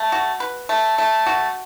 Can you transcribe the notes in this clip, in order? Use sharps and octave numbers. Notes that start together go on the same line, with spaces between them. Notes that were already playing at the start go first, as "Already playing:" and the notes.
Already playing: A3
F#4
B4
A3
A3
F#4